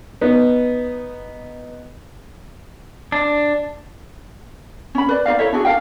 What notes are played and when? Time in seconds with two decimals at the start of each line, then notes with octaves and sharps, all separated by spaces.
0.21 B3 D#4
3.12 D4
4.95 C#4 B5
5.09 B4 D5
5.26 D#4 F4 D5 F5
5.39 E4 A4 C#5 E5
5.52 D4 E4 F#4 G#4
5.65 D4 A4 F5 G5